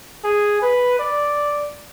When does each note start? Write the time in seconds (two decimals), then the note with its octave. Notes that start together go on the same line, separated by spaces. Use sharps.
0.24 G#4
0.62 B4
1.00 D5